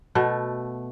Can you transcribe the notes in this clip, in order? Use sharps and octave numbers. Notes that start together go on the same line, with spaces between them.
B2 A3